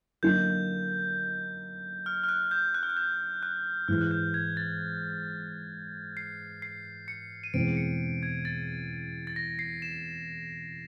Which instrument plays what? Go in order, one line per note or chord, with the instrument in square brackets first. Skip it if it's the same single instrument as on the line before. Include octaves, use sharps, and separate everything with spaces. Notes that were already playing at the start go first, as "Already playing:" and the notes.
[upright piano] D3 F#3 A#3 D#4 [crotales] G6
[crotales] F6
F6
F#6
G6
F#6
F6
F#6
G6
F#6
[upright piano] G#2 E3 G#3 [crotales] F6
[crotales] F#6
G6
G#6
A6
C7
C7
C#7
D#7
[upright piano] E2 B2 G#3 C4 [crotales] D7
[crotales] C#7
G#6
A6
A6
A#6
C7
E7